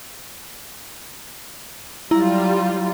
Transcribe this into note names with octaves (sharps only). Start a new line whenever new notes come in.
F#3 G3 E4 F4 A#5